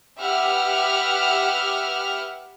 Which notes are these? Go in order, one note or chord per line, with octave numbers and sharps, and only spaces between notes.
G4 B4 E5 F#5 F6